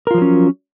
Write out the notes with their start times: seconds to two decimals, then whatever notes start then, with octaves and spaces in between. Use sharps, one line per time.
0.07 A#4
0.11 F4
0.14 F3
0.18 F#3
0.22 C#4